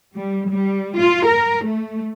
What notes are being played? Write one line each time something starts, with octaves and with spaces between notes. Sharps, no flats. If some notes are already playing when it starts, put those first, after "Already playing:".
G3
G3
F4
A#4
A3